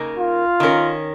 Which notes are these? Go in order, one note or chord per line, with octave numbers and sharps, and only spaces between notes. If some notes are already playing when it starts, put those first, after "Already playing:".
Already playing: C#3 A#3 D#4 A#4
F4
D#3 C#4 A#4